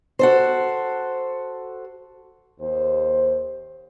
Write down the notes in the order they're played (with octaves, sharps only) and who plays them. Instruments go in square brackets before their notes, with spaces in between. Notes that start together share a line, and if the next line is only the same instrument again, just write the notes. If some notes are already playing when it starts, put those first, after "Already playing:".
[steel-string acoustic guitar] F#4 A4 C5
[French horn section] D#2 C5